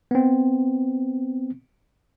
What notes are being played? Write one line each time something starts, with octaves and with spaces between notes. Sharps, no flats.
B3 C4